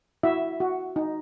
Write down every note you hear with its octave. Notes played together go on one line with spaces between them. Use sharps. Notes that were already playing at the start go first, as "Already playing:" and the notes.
E4 F#4 E5
F#4
D#4